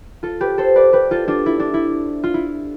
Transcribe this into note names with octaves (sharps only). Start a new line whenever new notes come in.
F4 A4
G4 B4
A4 C5
B4 D5
G4 B4
F4 A4
D4 F4
E4
D4
E4
F4
E4